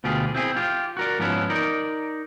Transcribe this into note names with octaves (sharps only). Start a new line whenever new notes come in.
D2 B2 F4 G4 G#4
C4 E4 G#4
F4 G4
F#4 A#4 D5
G#2 F3 B3 C#4 E4
D#4 A#4 D5